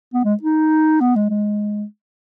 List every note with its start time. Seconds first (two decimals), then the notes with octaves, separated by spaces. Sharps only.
0.14 B3
0.24 G#3
0.43 D#4
1.00 B3
1.16 G#3
1.30 G#3